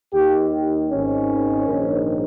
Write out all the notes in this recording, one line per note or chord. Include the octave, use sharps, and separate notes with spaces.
D#2 D#3 G4
G#1 G#2 D#3 C#4
A#1 G#2 D#3